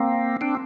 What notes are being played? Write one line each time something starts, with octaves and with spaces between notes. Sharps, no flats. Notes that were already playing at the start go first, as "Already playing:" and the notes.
Already playing: A#3 C4
C4 D4